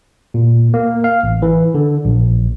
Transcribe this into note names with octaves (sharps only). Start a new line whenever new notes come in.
A#2
A#3
F5
A1
E3
D3
A#1